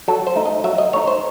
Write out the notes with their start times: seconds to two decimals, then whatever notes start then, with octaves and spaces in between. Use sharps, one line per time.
0.08 F#3 A4
0.27 C5
0.36 A3 D#4
0.45 D#5
0.64 F#3 E5
0.78 D#5
0.93 A3 D#4 C#5
1.07 C5